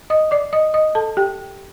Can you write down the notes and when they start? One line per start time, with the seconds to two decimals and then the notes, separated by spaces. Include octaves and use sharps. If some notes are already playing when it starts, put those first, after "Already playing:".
0.10 D#5 D#6
0.31 D5 D6
0.53 D#5 D#6
0.74 D#5 D#6
0.95 A4 A5
1.17 G4 G5